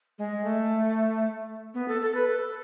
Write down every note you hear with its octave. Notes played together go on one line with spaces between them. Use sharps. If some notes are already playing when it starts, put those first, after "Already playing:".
G#3
A3
B3
A4
A4
B4
A4